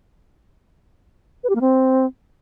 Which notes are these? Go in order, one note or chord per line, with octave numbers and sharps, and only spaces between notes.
B4
G4
A#3
C4